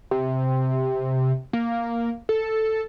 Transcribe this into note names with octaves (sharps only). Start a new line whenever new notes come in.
C3
A#3
A4